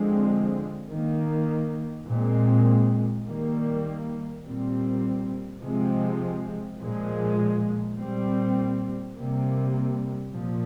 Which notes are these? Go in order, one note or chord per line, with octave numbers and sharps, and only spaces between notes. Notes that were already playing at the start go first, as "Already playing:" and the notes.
Already playing: D3 F3 G#3 C4
D#3 A#3
A#2 G#3 C4
D#3 G3 A#3
A#2 G3 C4
C3 F3 G#3 C4
A#2 F3 G#3
A#2 G3 C4
C3 G3 A#3
A#2 F3